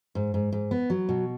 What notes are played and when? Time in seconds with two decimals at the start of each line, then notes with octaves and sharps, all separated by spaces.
0.15 G#2
0.34 G#2
0.52 G#2
0.71 B3
0.90 F#3
1.09 B2